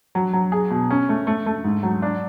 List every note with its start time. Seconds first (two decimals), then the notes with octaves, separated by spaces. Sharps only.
0.15 F#3
0.33 F#3
0.52 G#4
0.71 B2
0.90 C#4
1.09 A3
1.27 A3
1.46 A3
1.64 G#2
1.83 F#3
2.02 D4